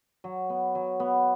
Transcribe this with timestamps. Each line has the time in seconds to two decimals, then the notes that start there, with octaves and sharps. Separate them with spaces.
0.24 F#3
0.50 B3
0.75 F#3
1.00 B3